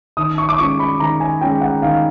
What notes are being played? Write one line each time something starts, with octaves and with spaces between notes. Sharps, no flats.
D#3 D#6
C#6
D6
G#3 C#4 F4 C#6
B5
D#3 A#5
G#5
G#3 C#4 F4 G5
F#5
D#3 F5